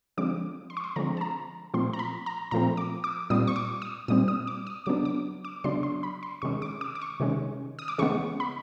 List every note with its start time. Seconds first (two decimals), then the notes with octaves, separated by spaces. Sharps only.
0.17 D3 F3 G#3 C4 D6
0.70 C6
0.77 C#6
0.84 C6
0.96 D3 F3 G#3 C4 A#5
1.17 A5
1.21 A#5
1.74 A#2 F3 A3 C4 C6
1.93 A#5
1.99 B5
2.26 A#5
2.51 A#2 F3 A3 C4 A#5
2.77 D6
3.04 D6
3.30 A#2 G3 C4 D#6
3.47 C#6
3.56 D6
3.82 D#6
4.08 A#2 G3 C4 D#6
4.28 D#6
4.47 D6
4.67 D#6
4.86 C#3 F#3 B3 D4 D6
5.05 D6
5.45 D6
5.64 C#3 F#3 B3 D4 C6
5.83 C6
6.03 B5
6.23 C6
6.42 C3 D#3 G#3 C#4 C#6
6.62 D6
6.81 D6
6.95 D6
7.01 C#6
7.20 C3 D#3 G#3 C#4
7.79 D#6
7.88 D6
7.98 C#3 E3 G#3 B3 C#6
8.40 B5